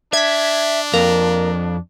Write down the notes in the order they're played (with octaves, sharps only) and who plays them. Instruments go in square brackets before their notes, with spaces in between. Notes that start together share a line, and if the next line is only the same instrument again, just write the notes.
[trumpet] D4 [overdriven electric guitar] E5 [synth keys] G#6 B6
[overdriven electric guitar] F2 [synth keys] A#3 A#5